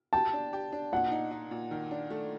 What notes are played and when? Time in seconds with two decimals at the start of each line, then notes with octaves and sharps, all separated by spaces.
0.13 G4 A5
0.33 D4
0.53 G4
0.72 D4
0.93 A#2 F#5
1.11 D#4
1.31 D#4
1.51 A#2
1.71 D#3
1.91 D4
2.10 A3